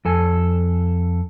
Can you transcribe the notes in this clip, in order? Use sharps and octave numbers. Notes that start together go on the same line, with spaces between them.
F2 A4 G#5